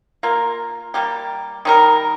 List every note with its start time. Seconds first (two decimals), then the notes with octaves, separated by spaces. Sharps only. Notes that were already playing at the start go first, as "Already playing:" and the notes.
0.23 A#3 F4 A#4
0.94 G3 A#3 G4
1.65 D#3 G3 D#4 A#4